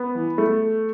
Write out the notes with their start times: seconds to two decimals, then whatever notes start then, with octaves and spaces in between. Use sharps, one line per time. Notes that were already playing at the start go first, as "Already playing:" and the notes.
Already playing: B3
0.15 E3
0.38 A3